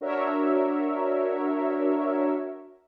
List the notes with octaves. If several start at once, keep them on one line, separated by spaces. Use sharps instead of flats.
D4 F#4 A#4 C#5 E5